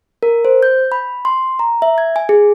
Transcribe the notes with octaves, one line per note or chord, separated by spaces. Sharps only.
A#4
C5
G6
B5
C6
A#5
E5
G#6
G#5
G#4